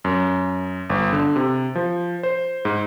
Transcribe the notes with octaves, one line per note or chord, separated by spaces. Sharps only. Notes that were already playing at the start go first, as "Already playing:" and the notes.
F#2
G1
D3
C3
F3
C5
G#2